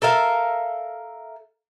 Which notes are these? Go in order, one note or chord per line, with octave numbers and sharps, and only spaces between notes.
A4 A#4 E5 F5